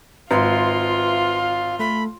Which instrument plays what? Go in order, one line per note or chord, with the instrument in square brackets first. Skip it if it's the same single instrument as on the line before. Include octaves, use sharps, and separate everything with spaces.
[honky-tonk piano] G#1 [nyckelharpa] F4 [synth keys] B4 E5 C6 [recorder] F5
[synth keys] A3 [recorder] B5